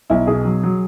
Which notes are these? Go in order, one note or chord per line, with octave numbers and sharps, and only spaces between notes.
B1 E4
B2 G#4
F#3
F#3